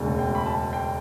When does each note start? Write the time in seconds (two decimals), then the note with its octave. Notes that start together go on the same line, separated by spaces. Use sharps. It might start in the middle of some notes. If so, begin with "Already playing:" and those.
Already playing: E1 D2 C#3
0.19 G5
0.35 B5
0.46 A5
0.73 G5